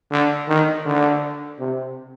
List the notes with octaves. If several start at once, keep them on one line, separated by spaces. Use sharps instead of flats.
D3
D#3
D3
C3